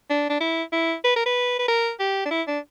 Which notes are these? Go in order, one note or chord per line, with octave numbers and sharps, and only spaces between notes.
D4
D4
E4
E4
B4
A#4
B4
B4
A#4
G4
D4
E4
D4